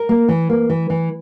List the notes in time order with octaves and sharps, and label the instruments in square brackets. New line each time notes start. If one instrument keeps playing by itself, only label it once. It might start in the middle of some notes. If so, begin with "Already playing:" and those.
Already playing: [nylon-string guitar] A#4
A#3
E3
A#3
E3
E3